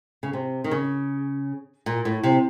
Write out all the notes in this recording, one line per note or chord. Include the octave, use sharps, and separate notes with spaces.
C#3
C3
D#3
C#3
A#2
A2
C3